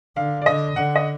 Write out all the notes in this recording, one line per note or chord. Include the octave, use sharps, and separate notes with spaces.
D3 F5
D5
D3 D#5
D3 F#5
D#5